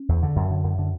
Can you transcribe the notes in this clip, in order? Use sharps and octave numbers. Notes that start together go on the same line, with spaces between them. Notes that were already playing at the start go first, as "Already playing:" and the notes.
Already playing: C#4
E2
D3
F#2
D3
F#2
D3